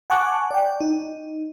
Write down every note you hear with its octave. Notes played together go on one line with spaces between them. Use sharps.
F#5 G#5 A5 C#6 D6 F#6
D5 G5
D#4